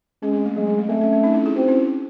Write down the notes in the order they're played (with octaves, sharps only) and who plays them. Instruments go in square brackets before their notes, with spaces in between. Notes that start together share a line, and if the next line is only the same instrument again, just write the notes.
[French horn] G#3 [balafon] C#4
[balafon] C4
A3
[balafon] F#3 [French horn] G#3
[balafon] F#3
A3
[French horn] A3 [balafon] C4
[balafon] C#4
C#4
C4 D#4
C#4 E4
E4 G#4
[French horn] C4 [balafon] D#4 F#4
[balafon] C#4 E4
C#4